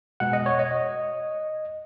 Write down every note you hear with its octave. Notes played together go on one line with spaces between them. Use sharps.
B2 G#3 F#5
D#5
C#5
D#5